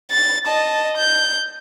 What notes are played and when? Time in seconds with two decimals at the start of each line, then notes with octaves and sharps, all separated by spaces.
0.11 A6
0.47 D#5 A5
0.98 G6